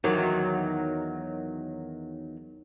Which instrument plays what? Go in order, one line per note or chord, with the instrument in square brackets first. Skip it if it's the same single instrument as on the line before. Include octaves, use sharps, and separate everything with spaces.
[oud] E2 D#3 F#3